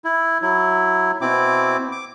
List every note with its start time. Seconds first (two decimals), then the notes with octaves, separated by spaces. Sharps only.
0.05 E4
0.42 F#3 E4
1.21 B2 C4 E4 D6
1.92 D6